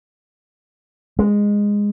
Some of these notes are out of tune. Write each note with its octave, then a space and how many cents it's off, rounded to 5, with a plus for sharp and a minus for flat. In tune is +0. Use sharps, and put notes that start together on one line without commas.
G#3 -15